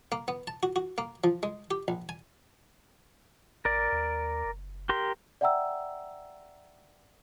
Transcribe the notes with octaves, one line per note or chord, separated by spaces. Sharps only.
A#3
B3
A5
F#4
F#4
A#3
F3
G#3
G4
A#1
G#5
A1 A#4 D5
D#2
F#1
G4 A#4 C6
D5 E5 F#5 G5 A#5 E6